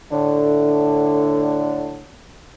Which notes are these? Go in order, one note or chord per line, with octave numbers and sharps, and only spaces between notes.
A2 D3